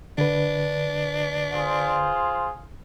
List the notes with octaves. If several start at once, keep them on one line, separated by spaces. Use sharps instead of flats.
D3 D4 B4
F4 G#4 C5